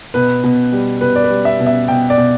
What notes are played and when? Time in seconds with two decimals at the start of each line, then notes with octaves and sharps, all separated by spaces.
0.14 B2 B4
0.44 B2
0.72 G3
1.01 B2 B4
1.16 D5
1.24 B4
1.30 G3
1.45 E5
1.60 B2
1.66 E5
1.88 B2 G5
2.10 D5
2.18 B2